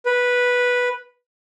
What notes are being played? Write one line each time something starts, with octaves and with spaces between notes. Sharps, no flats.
B4